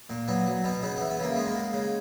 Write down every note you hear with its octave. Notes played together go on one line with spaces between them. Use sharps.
A#2
F#3 B3
F#3
B2 B3
C#3 B3
B3
E3
B3
C#3 A#3
G#3 B3
A#3
G#3
C#3